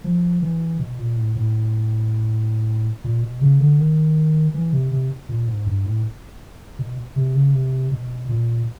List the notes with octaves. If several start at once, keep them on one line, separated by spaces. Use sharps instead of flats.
F3
E3
B2
A#2
A2
A2
A#2
B2
C#3
D3
D#3
E3
C3
C3
A#2
G#2
G2
A2
B2
C3
C#3
C3
B2
A#2